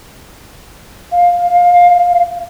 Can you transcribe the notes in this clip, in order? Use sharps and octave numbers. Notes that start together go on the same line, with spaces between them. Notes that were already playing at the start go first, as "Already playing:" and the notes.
F5